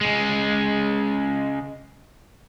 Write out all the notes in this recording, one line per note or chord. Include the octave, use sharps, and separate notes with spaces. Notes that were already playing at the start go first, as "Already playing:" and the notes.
C#3 G#3